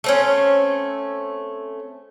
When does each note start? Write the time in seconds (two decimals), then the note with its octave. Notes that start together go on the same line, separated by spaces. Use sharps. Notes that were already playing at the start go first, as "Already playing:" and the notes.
0.04 A3 C4 C#4